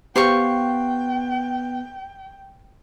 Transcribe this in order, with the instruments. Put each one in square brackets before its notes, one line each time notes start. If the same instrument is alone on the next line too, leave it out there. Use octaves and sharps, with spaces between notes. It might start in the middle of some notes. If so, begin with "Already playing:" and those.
[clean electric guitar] B3 [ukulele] G4 [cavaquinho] C5 F5 C#6 [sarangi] G5